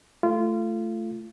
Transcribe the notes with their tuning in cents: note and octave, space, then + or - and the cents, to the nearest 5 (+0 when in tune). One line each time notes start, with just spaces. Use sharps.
A3 +0 F4 -25